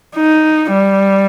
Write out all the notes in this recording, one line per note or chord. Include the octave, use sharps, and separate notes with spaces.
D#4
G3